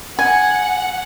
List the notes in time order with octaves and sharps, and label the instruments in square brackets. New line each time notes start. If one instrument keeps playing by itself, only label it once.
[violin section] F#5 [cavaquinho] G#5